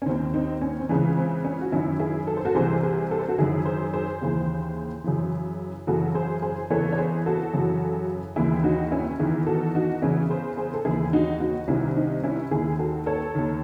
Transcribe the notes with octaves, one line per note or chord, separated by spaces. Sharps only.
C#4
D#2 D#3 C4
C4 D#4
C#4
C4
C#2 C#3 E3 C#4
C4
C#4
F#4
F#2 D#3 C#4 E4
E4 G#4
A4
C5
F#4 A4
C2 C3 E3 G#4 C5
G#4 C5
A4
C5
F#4 A4
F#2 D#3 E4 G#4
G#4 C5
G#4 C5
D#2 C#3 E3
F#2 C#3 E3
F#2 C#3 E3 F#4 A4
G#4 C5
G#4 C5
E2 C#3 E3 A4 C#5
C#5
G#4 C5
F#4 A4
F#2 C#3 E3
D#2 C#3 E3 E4 G#4
D#4 F#4
C#4 E4
E2 D#3 E4 G#4
F#4 A4
D#4 F#4
E2 C#3 E3 C#4 E4
G#4 C5
G#4 C5
A4
D#2 C#3 E3 E4 G#4
D#4 F#4
D#4 F#4
C2 C3 D#3 C#4 E4
C4 D#4
C#4 E4
D#2 D#3 E4 G#4
F#4 A4
A4 C#5
D#2 D#3